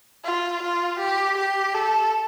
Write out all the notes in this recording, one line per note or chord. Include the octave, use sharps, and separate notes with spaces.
F4
F4
G4
G4
A4